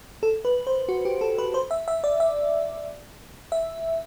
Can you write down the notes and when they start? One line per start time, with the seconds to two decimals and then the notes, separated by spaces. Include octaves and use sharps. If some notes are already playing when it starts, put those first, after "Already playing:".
0.23 A4
0.45 B4
0.67 C5
0.89 F#4
1.05 G4
1.21 A4
1.38 B4
1.54 C5
1.71 E5
1.88 E5
2.04 D5
2.20 E5
3.52 E5